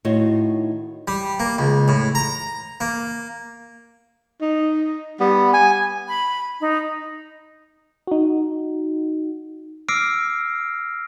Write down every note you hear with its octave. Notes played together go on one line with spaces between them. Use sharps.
A2 D#3 D#4 F4 F#4 C#5
G3
A#3
C#2
A2
A#5
A#3
D#4
G3 B3
G#5
B5
D#4
D#4 F#4
D6 E6 F6 A#6 C7 D7